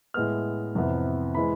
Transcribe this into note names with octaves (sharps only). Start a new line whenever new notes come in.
A2 G#3 B3 F6
F2 C3 E3 B3
E3 G#3 B5